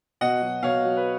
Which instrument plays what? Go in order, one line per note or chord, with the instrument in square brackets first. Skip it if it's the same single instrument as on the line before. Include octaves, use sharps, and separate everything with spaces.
[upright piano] B2 [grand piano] D#5 F#5
[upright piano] F#3
[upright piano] B2 [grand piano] C#5 F5
[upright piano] F#3
[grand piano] B4